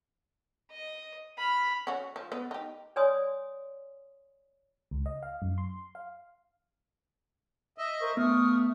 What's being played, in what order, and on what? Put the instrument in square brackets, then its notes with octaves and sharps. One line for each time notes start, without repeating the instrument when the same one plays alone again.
[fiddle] D#5
B5 F6
[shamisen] C#4 F#4
F3
B3 B4
D#4 G4
[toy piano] C#5 D5 G#5 C6 D#6
[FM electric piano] C#2
D#5
F5
F#2
C6
F5
[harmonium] D#5 E5
[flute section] A#4 C5 C#6
[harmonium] A3 [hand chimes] B3 [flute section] C#6 D#6 F6